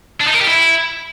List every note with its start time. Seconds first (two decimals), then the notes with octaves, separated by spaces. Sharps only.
0.21 D4
0.28 D#4
0.34 A#4
0.41 G4
0.48 E4